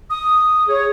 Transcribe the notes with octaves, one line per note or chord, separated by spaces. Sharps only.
D#6
G#4 C#5